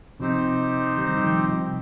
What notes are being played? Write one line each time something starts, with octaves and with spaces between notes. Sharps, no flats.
C3 F3 C4 D#4 G4 C5
D#3 G3
D#3
C3 F3
C3